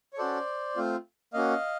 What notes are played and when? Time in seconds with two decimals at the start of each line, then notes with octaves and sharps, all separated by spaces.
0.13 C#5
0.18 C#4 F#4 A4 C5 D5
0.76 A3 C4 F4
1.33 A#3 C#4 F#4 D#5 F5